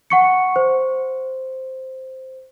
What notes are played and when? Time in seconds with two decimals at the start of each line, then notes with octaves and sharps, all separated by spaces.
0.10 F#5 C#6 C#7
0.56 C5